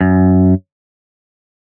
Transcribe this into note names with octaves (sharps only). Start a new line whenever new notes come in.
F#2